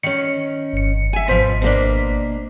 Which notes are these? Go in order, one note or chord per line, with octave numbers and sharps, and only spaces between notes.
D#3 C#4 C#7
G1 C#7
E5 G#5
G#1 B2 F3 C5 B6
B2 A#3 D4